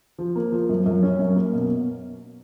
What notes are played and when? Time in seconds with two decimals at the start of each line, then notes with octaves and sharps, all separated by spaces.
0.18 F3
0.36 A#3
0.52 F3
0.69 F#2
0.86 F#2
1.03 C#4
1.19 F#2
1.36 A#3
1.53 B2